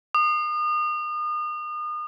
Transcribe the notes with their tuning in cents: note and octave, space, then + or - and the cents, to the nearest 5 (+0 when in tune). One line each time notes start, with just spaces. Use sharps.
D#6 -35